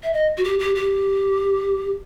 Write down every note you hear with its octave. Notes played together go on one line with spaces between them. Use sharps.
E5
D#5
F#4
G4
G4
G4